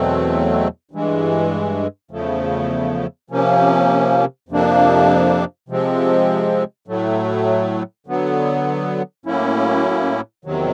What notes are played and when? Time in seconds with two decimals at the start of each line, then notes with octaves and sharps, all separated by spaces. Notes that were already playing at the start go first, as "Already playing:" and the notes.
Already playing: E2 B2 F#3 A3 C4
0.91 G2 E3 G#3
2.11 E2 C#3 F3 A3
3.30 C3 F3 A#3 C#4
4.49 F2 C3 F3 A#3 D4
5.69 C3 F3 G#3 C4
6.88 A2 F#3 A3
8.07 D3 F#3 B3
9.26 A2 F#3 A#3 C#4 E4
10.45 E2 C3 D#3 F#3